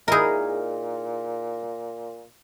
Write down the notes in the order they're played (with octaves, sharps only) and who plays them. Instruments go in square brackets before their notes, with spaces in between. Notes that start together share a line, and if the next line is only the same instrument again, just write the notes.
[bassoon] A#2 [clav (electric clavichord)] D#4 E4 D#5 [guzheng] G#4 A#4